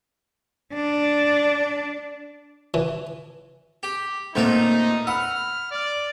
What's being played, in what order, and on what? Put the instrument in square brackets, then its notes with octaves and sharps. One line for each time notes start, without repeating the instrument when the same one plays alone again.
[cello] D4
[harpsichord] E3
G4
[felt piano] A#2 C4 [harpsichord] A3 B3 A#4 [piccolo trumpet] D#4
[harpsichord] F#5 [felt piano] B5 E6 [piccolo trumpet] F6
[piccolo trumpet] D5